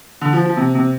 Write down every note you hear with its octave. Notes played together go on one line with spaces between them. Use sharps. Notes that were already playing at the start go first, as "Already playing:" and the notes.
D3
F3
F3
C3
C3